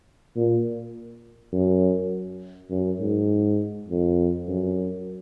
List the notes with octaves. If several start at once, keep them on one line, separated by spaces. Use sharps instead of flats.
A#2
F#2
F#2
G#2
F2
F#2